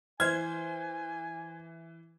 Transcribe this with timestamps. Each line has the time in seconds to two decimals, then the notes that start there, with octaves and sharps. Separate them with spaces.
0.20 E3 C5 G#5 F6 G#6